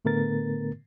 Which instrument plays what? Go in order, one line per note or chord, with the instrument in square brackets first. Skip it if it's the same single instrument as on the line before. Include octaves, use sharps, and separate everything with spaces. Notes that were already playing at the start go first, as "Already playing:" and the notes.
[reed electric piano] A2 D3 A3 B3 A#4 A6